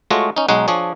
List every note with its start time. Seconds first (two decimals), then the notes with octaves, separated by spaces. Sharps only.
0.10 G#3 A3 F4 F#4 C#5 D#5
0.36 C#4 D#4
0.49 B1 G#3 D#4 C#5 F#5
0.68 F3 D4 G#4 C#5 G#5